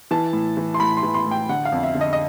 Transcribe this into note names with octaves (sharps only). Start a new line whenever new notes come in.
E3 A5
A2
E3
C6
A2 B5
C6
E3
C6
A2
G5
D3 F#5
F5
F2
E5
D3
D#5
D#5